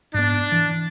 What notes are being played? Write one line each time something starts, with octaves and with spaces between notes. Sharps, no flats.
G#2 B3 D4
E3